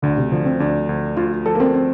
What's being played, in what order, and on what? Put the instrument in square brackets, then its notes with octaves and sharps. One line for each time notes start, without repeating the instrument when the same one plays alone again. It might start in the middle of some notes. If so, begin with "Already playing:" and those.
[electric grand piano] D2 [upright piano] D3
[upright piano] C3
[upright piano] D3 [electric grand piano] F3
[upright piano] C4
[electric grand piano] D2 [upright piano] D4
[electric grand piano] D2
[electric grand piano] D2 [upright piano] F4
[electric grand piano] F3 [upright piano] A4
[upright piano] A#3
C4
C4